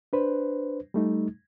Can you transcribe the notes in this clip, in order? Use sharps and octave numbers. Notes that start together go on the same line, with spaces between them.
D4 B4 C5
G3 A3 D#4